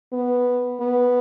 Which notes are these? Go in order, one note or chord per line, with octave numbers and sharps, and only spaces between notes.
B3
B3